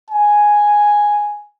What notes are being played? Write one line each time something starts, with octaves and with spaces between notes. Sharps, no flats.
G#5